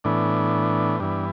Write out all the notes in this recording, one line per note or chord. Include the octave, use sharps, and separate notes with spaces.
A2 E3 B3 D4
G2 E3 B3 D4